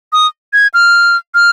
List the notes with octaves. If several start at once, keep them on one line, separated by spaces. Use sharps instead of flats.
D#6
G#6
F6
F6